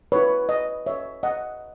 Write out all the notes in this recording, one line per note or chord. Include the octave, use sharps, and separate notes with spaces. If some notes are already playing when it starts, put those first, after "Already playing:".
E4 B4 C#5
D#5
C#5 E5
D#5 F#5